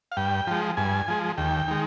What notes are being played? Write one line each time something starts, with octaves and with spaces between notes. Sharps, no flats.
F5
G2 G5
F3 G#3
G2 G#5
F3 G#3
D#2 G5
D#3 G#3